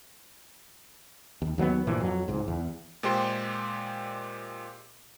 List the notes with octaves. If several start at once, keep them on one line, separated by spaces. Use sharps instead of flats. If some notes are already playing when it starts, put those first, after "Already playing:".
D#2
D#2 F#3 G#3 B3
G2 A#2 E3 F3
F2 F#3
C#2 G#2
E2
A#2 G#3 G4 C5 G5 C6